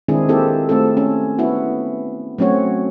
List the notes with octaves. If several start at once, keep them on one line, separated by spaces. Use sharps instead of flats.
D#3 G#3 C4 D4 E4 G#4
A#3 C4 E4 G4 A4
A3 C4 F4 A4
C#4
B3 E4 F#4
F#3 A3 C4 C#4 F#4 C#5